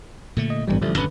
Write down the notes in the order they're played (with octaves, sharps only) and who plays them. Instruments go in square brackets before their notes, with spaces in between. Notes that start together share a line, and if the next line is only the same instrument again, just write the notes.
[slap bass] A#2 D3 A3
[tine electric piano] D#5
[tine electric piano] A1 G2 G3 [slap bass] E3 G#3 B3
[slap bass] A1 D3 [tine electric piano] F3 G3 A3
[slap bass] D#1 F#2 C#4 [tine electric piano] D3 B4